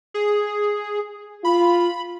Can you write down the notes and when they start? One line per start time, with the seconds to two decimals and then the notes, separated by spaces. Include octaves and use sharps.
0.14 G#4
1.44 F4 B5